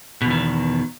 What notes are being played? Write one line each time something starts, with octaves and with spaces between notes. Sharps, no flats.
E2 B2 D#3